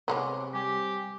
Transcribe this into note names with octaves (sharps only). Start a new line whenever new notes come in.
C3 G#3 A#3 B3 C#5 C6 D6
G3 G4 G#5